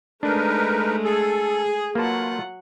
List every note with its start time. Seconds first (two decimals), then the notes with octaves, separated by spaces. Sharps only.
0.23 G#3 A3 D4 D#4 A#4 B4
1.04 G#4 A4
1.95 F#3 A3 A#3 F4 B4 F#5 A5